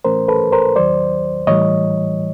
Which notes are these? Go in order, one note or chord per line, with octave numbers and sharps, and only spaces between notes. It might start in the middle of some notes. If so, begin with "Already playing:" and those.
A2 E3 A3 C#4 A#4 C5
A4 B4
A#4 C5
D#2 D#3 F#3 C5 D5
A2 E3 G3 C#5 D#5